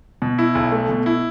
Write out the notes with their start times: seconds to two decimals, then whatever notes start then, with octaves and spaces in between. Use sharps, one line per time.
0.22 B2
0.38 E4
0.55 B1
0.72 A3
0.89 B2
1.06 E4